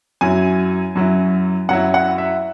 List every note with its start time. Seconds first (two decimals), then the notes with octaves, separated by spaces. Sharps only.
0.21 F#2 F#3 E4 G#5
0.95 F#2 F#3 E4
1.69 F#2 F#3 E4 F#5
1.94 F#5
2.18 E5